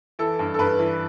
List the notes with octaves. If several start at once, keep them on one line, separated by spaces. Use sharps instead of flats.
E3 A4
G2
A4
G2 B4
E3